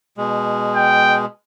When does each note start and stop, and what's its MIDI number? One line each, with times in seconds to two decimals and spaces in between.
0.18 1.25 47
0.18 1.25 56
0.76 1.19 79